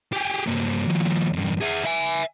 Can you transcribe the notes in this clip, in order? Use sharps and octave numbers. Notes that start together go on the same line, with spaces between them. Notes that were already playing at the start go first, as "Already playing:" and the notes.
G4 G#4
G2 A#3
D#2 F3
E2 G2
E4 G#4
E5 G#5